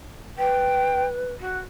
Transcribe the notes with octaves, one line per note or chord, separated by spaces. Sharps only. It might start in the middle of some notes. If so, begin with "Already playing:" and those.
B4 G5
F#4